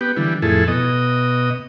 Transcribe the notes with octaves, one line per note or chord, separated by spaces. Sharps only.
B3 G4
D3 E3 G3
F2 A2 E4 G#4 A4
B2 D#5